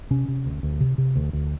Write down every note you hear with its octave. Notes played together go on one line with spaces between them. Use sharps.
C3 C#4
C3
D2
D2
C3
C3
D2
D2